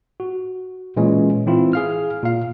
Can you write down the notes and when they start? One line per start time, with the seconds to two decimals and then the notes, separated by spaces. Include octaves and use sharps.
0.20 F#4
0.97 A#2 E3 G#3 C#4
1.46 E3 C4 E4 F4
1.73 G#4 F5 F6
2.23 A#2 F5